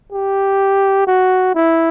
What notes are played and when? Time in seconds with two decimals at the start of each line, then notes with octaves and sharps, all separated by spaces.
0.12 G4
1.07 F#4
1.55 E4